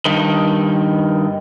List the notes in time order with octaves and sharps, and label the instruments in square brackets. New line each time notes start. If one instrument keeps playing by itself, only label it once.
[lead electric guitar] G2 D#3